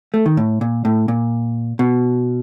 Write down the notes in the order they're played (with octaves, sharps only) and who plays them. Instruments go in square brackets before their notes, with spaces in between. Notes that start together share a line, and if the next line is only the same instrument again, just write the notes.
[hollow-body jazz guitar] A3
D#3
A2
A#2
A2
A#2
B2